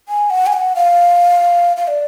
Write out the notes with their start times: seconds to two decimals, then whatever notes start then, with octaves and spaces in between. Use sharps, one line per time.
0.09 G#5
0.30 F#5
0.47 G#5
0.53 F#5
0.76 F5
1.77 F5
1.88 D5